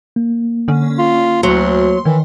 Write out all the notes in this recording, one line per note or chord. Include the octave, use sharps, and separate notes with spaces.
A#3
D3 C#4
F4
D2 F#3 C6
D#3 E3